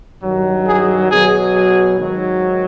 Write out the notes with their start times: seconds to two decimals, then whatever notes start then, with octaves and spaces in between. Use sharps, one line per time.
0.22 G2 D#3 F#3
0.66 G#4
1.10 B2 F#3 G#4
1.54 G#4
1.98 G#2 D#3 F#3